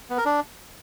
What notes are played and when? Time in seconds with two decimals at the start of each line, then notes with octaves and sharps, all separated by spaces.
0.10 B3
0.18 A#4
0.25 D4